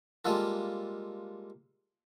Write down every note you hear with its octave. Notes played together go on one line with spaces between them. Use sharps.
G3 G#3 A#3 F4 A4